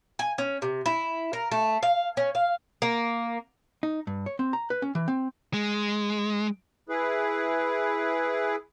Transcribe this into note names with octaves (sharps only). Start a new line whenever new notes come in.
G#5
C#4
C3
E4
A#4
A3
F5
C#4
F5
A#3
D#4
G2
C#5
C4
A#5
B4
C#4
E3
C4
G#3
E4 G#4 B4